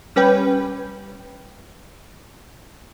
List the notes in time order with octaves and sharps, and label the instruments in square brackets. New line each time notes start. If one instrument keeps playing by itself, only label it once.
[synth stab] G3 C#4 B4 G5